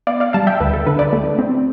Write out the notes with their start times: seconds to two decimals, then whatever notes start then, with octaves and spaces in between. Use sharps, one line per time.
0.07 B3 D5 F5
0.20 D5 F5
0.33 G3 F5 A5
0.47 E5 G5
0.60 D2 B4
0.74 A4
0.87 D3 B4
0.99 B4 D5
1.13 A3
1.39 C4